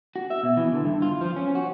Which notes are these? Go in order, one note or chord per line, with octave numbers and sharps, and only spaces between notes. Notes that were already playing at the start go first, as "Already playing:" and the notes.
F#4
E5
B2
E3
D3
G2
F4
F3
C#4
F#4